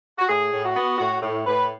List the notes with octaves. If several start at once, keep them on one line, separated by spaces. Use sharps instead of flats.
F#4
A2 G#4
A2
F#4
B3
A2 F#4
A2
A2 B4